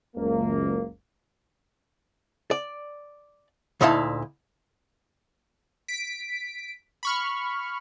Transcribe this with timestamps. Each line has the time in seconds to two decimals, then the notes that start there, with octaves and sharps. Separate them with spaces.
0.16 F#1 C#2 A#3
2.51 D5
3.81 D2 A#2 D#4 E4 F5 A5
5.88 B6 D7
7.03 B5 C#6 F6